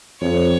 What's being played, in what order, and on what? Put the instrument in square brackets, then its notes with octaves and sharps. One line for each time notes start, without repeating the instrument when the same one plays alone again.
[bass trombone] F2 [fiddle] C#5